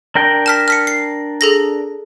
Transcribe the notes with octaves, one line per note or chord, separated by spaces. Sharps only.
D4 A#4 G5
A5 F6 B6
F6 B6 C#7
C7
G#4 A4 A#6